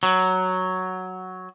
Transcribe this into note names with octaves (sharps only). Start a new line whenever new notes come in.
F#3